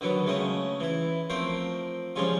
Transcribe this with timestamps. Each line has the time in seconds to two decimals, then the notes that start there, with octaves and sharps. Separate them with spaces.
0.01 D3 D#3 F#3 B3
0.26 C#3 G#3 A3 D#5
0.80 E3 E4
1.30 F3 A3 C4 A#4 C5
2.16 F3 G3 G#3 C#4 F4